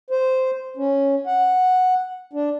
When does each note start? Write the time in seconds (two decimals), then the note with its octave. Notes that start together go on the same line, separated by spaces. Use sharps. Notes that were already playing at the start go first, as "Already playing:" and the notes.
0.11 C5
0.77 C#4
1.26 F#5
2.33 D4